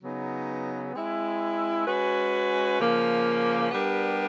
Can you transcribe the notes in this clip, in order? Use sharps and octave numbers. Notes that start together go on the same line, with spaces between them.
C#3 F#3 B3 D#4
G#3 C4 E4
G#3 C#4 F#4 B4
C#3 F3 A#3
G3 B3 D4 G4 A#4